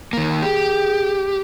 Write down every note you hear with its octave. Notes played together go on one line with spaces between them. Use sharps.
D#3 A#3
G4 G#4